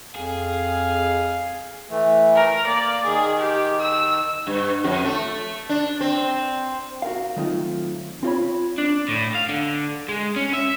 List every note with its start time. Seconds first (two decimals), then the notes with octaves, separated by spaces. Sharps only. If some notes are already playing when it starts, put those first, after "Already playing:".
0.16 F2 G#4 F5
1.90 E3 A3
2.36 A#4
2.67 A#3 D5
3.04 D#3 G#4
3.39 G4
3.79 E6
4.47 G2
4.84 F2
5.05 A3
5.69 D4
6.01 C4
7.02 F#4 A#4 F5
7.36 D#3 F#3 A3 C4 D#4 F4
8.23 C4 F4 C#5 B5
8.78 D4
9.09 A2
9.35 F5
9.49 D3
10.08 G#3
10.36 C#4
10.53 E5